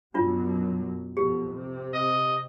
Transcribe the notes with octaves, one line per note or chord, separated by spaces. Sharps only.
F#2 B2 F#3 D4 F4
F2 B2 G4
C3
D#5